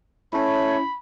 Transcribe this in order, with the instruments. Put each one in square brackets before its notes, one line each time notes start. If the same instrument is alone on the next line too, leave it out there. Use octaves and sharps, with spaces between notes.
[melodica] A3 [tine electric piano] C#4 E4 [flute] C#5 [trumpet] B5